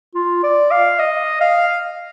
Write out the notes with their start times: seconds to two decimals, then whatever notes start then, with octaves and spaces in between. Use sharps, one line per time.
0.15 F4
0.43 D5
0.71 F5
0.99 D#5
1.40 F5